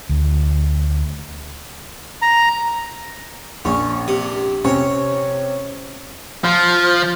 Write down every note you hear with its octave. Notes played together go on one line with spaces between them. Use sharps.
D2
A#5
A#1 C#4
C3 D#6
C3 C4 C#4 C#5
F3